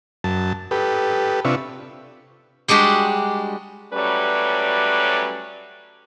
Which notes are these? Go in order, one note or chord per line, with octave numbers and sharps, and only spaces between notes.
F#2 A5
G4 A4 B4
C3 D4 F4 B4 E5 C#6
G3 G#3 D4 F#4 G4
F#3 G3 A3 C#4 B4 D5